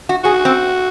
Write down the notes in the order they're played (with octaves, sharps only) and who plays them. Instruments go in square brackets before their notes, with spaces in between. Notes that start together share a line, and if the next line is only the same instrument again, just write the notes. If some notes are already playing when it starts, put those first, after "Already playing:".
[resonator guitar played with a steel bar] F#4
[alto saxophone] F#4 [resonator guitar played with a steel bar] G#4
[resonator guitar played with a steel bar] C4